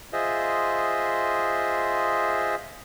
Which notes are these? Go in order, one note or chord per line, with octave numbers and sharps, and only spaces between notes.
F4 G#4 C5 D#5 E5